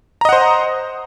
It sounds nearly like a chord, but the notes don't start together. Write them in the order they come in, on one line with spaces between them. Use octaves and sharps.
A#5 D#5 F#5 C5